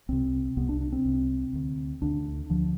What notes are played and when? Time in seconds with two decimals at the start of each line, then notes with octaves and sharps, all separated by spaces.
0.09 C2 C3 C4
0.57 C2 C3 B3
0.69 D4
0.81 D4
0.92 C4
1.05 C2 C3
1.53 D2 D3
2.02 D2 D3 D4
2.50 D2 D3 F3